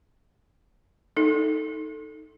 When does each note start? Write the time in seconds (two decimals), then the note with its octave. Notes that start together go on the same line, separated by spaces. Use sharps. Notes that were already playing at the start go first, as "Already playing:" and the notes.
1.16 D#4 A4